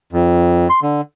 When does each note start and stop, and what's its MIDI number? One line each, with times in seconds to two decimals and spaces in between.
0.13 0.68 41
0.70 0.80 84
0.82 1.01 50